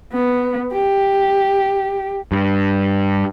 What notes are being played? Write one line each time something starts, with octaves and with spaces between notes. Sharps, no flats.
B3
G4
G2